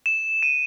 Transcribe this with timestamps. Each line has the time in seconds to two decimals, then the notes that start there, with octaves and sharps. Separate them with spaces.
0.06 E7
0.43 D#7